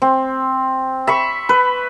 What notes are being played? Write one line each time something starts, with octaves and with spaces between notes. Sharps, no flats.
C4
E5 B5 C#6
B4